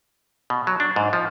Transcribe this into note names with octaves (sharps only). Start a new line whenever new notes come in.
B2
F#3
D4
G#2
F3